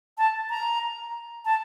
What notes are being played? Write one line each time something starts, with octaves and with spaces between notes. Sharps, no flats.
A5
A#5
A5